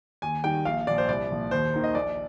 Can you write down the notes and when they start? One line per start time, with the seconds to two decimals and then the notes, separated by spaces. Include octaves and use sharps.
0.22 D#2 G#5
0.44 D#3 G3 G5
0.65 A#1 F5
0.87 A#2 F3 D5
0.98 C5
1.08 C2 D5
1.30 A#2 F3
1.51 D#2 C5
1.73 D#3 A#3
1.84 D#5
1.95 A#1 D5